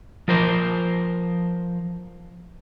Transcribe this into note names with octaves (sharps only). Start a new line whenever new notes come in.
F3 A#4 C5